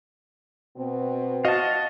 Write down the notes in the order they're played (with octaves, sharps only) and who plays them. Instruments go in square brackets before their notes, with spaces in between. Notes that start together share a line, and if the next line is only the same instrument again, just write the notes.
[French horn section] B2 C4
[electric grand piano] F#4 D#5 C#6 [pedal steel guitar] F5 A5